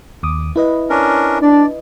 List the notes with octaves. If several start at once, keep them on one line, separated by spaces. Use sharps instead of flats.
D#2 D6 D#6
E4 B4 D#5
C#4 D4 A#4
D4 D5